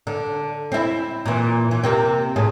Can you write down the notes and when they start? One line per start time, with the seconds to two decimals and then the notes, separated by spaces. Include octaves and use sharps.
0.07 D3
0.72 C4 E4
1.26 A#2 E3
1.71 E3
1.83 C3 A#3 C4
2.36 A2 G#4